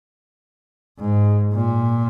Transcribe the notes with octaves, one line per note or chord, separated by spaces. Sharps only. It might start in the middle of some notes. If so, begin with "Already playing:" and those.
G#2
A#2